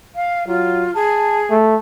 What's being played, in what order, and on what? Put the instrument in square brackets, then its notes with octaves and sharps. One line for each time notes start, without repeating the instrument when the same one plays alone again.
[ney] F5
[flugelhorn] F#3 [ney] F4
[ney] G#4 [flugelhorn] A5
[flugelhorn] A3